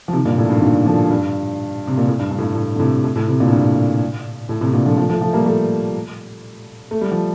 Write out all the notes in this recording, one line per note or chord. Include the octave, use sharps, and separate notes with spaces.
F3
C3 D#3
G2 A#2
A2
G2
D#3
A#2 D3
D3 F3
G2
C3
A#2
A2
G2
G2
A2
G2
A2
D3
A2 C3
A2
A2
A2 C3
A#2 D3
A2
G2
A2
A2 C3
A#2 D3
D3 F3
F3 A3
F3 A3
F3 A3
G3 A#3
F3 A3
A3
G3
F3